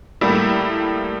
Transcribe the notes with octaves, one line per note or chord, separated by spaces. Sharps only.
A2 G3 A#3 E4